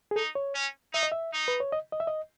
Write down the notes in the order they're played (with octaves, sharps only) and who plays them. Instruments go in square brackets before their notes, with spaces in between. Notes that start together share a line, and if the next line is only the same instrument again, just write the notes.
[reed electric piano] G#4
[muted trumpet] D#4 [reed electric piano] A4
[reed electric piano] C#5
[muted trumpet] C#4
[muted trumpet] D#4 [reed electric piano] E5
[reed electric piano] D#5
E5
[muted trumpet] D#4
[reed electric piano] B4
C#5
D#5
D#5
E5
D#5